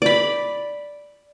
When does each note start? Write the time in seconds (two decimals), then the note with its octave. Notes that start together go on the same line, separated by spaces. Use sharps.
0.02 D5 B5